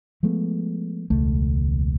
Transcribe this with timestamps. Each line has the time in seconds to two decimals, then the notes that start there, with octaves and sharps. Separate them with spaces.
0.23 F3 G#3 A3 B3
1.10 E1 C#2 A3